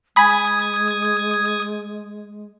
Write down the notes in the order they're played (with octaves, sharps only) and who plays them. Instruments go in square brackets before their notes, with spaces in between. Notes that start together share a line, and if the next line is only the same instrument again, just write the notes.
[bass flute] G#3 [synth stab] G#5 B5 [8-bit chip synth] D#6 G#6